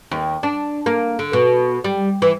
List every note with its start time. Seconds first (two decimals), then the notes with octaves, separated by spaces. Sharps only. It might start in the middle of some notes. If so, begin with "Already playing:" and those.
0.11 D#2
0.43 D4
0.86 A#3
1.19 D3
1.33 B2
1.84 G3
2.22 E3